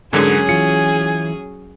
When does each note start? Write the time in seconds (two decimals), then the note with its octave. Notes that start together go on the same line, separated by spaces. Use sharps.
0.13 G#2 D3 F#3 G#3 C#4 G#4 A#4 G#5
0.49 E3 F4 C#7